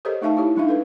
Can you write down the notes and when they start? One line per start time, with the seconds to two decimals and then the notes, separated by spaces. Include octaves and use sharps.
0.05 G4 A4 A#4 C5 C#5 D#5
0.22 A3 D#4 E5 F5 A5
0.37 E4 F4 G4 C#5
0.56 G3 G#3 D4 D#4 E5 F5
0.68 A4 B4